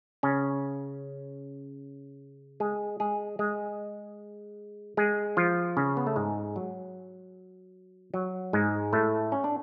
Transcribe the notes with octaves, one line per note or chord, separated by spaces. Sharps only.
C#3 C#4
G#3 G#4
G#3 G#4
G#3 G#4
G#3 G#4
F3 F4
C#3 C#4
B3
A3
G#2 G#3
F#3
F#3
G#2 G#3
A2 A3
C#4
D4